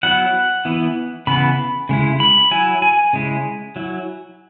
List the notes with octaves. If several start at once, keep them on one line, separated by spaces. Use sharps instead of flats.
F#3 B3 E4 F#5
E3 B3 E4
C#3 E3 B3 B5
C#3 G#3 E4
B5
F#3 E4 G#5
G#5
C#3 G#3 E4
F#3 E4